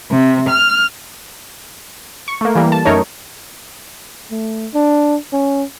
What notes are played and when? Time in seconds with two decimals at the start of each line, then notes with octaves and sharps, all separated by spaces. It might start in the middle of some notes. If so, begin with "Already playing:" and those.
0.11 C3
0.48 F6
2.28 C#6
2.41 A3 A#3
2.55 E3 G3 A#3
2.72 A5
2.85 F#2 A3 D#4 A#4 C#5
4.31 A3
4.74 D4
5.33 C#4